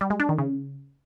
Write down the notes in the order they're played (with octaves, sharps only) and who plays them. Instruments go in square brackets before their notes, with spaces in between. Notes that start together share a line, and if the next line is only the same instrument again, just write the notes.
[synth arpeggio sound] G3
G#3
D4
D#3
C#3